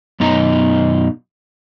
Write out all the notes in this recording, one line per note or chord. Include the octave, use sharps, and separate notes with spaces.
F#2 B2 D#4 A#5